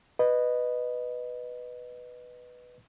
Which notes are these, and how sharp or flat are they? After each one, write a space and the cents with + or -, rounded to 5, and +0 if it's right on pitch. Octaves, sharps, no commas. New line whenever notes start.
B4 +0 D#5 -15